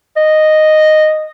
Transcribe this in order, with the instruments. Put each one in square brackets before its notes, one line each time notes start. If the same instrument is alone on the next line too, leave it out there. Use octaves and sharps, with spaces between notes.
[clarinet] D#5